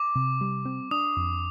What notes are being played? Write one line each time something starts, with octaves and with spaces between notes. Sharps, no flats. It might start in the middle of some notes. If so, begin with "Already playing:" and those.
Already playing: D6
C3
G3
C4
D4 D#6
F2